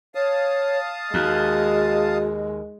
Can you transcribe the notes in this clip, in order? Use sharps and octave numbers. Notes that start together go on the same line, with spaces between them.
C#5 F5 A5 D#6
D#2 G#3 F#4